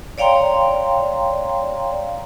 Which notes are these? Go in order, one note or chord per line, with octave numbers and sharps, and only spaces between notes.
C#5 D5 F5 G5 A#5 C6